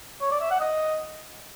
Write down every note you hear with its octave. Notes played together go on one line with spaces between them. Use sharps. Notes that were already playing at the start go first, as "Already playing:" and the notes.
C#5
D5
E5
F#5
D#5